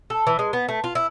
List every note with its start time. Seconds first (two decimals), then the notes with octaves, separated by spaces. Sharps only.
0.10 A4
0.27 E3
0.39 G#3
0.53 B3
0.68 A3
0.84 F4
0.95 E4